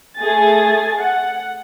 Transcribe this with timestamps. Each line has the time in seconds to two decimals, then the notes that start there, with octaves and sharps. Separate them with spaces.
0.17 A3 G#4 G#5 A6
0.97 F#5